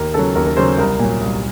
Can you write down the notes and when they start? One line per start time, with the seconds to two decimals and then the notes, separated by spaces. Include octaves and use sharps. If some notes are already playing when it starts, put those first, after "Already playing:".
Already playing: D#2 A#4
0.14 C#3 F#3 A4
0.35 D#2 A#4
0.46 A#4
0.57 C#3 F#3 C5
0.78 C2 A#4
0.99 A#2 F#3
1.21 C2